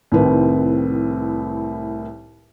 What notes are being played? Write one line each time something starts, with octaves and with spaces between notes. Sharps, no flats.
C2 A2 D#3 C4 B4